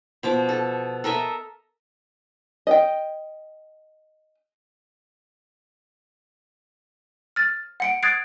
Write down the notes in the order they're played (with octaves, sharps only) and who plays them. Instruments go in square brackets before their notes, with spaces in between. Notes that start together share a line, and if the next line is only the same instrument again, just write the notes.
[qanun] B2 F3 D6
A4
A4 A#4 D#5 E5
[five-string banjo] D#5 G5
[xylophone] F6 A6
F#5 C#7 D7
D#6 F#6 G#6 A6 C7 D7